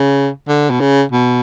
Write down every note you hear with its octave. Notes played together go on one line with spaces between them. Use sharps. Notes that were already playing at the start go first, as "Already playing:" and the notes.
Already playing: C#3
D3
B2
C#3
B2